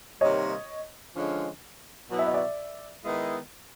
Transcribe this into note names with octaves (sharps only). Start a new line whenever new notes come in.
C3 D#3 G3 A#3 D#4 C#5 D#5
D3 F3 G#3 C#4
B2 F#3 B3 E4
E5
D#5
D5 E5
D#3 G#3 B3 E4